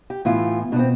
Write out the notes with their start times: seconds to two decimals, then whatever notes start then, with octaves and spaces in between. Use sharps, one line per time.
0.10 G4
0.25 A2 E3 B3 F4
0.72 B2 D4
0.76 B3 C4